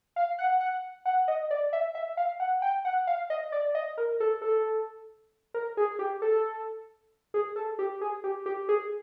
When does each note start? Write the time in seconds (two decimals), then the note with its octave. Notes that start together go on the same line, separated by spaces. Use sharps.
0.16 F5
0.39 F#5
0.61 F#5
1.06 F#5
1.28 D#5
1.51 D5
1.73 E5
1.95 E5
2.17 F5
2.40 F#5
2.62 G5
2.85 F#5
3.07 F5
3.30 D#5
3.52 D5
3.75 D#5
3.98 A#4
4.20 A4
4.42 A4
5.54 A#4
5.77 G#4
5.99 G4
6.22 A4
7.34 G#4
7.56 A4
7.79 G4
8.01 G#4
8.24 G4
8.46 G4
8.69 G#4